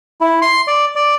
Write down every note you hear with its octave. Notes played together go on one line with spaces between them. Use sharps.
E4
C6
D5
D5